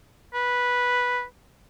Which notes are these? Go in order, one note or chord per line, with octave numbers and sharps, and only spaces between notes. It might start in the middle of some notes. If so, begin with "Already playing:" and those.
B4